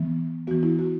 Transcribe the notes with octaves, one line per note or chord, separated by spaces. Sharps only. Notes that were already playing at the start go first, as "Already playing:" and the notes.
Already playing: E3 B3
E3 B3 F#4
E4
F#4